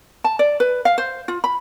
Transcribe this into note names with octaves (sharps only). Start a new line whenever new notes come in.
A5
D5
B4
F5
C5
F4
B5